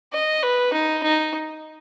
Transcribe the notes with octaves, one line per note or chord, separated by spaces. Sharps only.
D#5
B4
D#4
D#4